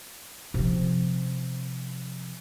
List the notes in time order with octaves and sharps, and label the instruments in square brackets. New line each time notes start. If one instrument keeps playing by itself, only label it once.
[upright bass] C3 F3